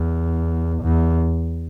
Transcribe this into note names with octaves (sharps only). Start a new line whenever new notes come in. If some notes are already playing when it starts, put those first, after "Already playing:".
Already playing: E2
E2